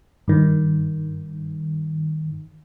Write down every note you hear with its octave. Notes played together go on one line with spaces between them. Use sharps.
G2 D#3